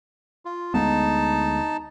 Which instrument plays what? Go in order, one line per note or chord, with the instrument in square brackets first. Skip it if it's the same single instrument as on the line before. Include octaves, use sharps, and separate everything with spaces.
[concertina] F4
[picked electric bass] D2 G#3 B3 [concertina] D#4 A5